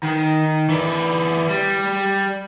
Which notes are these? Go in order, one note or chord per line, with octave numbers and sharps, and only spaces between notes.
D#3
E3 D5
G3